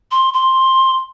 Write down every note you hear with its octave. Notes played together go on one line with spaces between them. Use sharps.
C6
C6